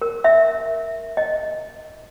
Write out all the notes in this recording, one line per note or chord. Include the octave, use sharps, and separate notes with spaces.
A#4
E5
D#5